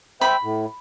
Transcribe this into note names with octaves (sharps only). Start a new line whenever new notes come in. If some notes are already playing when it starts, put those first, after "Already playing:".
C5 E5 G5 B5
A2